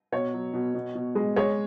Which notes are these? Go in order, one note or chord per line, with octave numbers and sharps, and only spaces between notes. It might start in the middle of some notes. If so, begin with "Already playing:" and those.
B2 C#5
F#3
B2
B2
B2
G#3
G#3 C#5